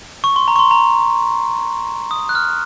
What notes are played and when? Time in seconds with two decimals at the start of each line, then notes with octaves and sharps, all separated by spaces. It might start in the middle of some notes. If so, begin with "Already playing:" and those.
0.24 C#6
0.36 C6
0.48 A#5
0.56 C#6
0.59 C6
0.71 A#5
2.11 D#6
2.29 F#6
2.35 F6